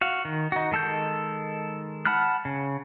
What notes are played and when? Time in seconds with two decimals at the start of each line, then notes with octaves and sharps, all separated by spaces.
0.01 F#4 F5
0.25 D#3
0.52 D#4 F#4
0.71 D#3 G#3 A4 A#4 G6
2.05 F#5 A5 B5 F6 F#6
2.45 C#3